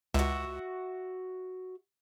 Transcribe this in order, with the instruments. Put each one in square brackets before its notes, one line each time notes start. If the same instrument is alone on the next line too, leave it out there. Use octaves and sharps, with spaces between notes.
[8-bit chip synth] C#2 [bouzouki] F#4 E5